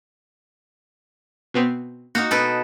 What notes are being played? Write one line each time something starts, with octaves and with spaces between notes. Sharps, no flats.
B2 B3 C4
A#3 D#4 F#4
B2 A4 B4